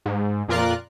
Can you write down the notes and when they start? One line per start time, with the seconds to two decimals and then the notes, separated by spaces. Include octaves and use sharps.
0.06 G#2
0.48 F2 A#2 F4 A#4 D5 F#6